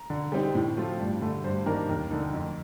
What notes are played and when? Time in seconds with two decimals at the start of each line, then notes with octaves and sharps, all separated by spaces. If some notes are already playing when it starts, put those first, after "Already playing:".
Already playing: A#5
0.10 D3
0.32 G3 C4 D#4
0.55 A2
0.77 F3 A3 C4 F4
1.00 G2
1.21 D3 A3
1.44 G2 C5
1.66 D#3 A#3 D4 A#4
1.89 D#2 A#4
2.11 D3 A3 D#4
2.34 F2